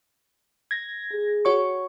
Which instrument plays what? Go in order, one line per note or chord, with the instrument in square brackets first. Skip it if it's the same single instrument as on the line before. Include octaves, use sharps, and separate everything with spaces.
[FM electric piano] G#6 A#6
[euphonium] G#4
[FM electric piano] F#4 C#5 C#6